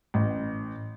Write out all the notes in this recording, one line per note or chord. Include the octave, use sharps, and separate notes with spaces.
A1